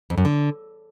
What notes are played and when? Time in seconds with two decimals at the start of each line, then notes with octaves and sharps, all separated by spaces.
0.10 F2
0.18 F#2
0.25 D3